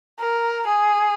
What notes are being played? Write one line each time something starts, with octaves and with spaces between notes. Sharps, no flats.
A#4
G#4